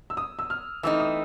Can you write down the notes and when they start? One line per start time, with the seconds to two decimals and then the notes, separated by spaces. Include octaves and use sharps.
0.10 E6
0.17 D#6
0.39 E6
0.50 F6
0.83 E3 A3 C4 D#4 E6
1.00 D#6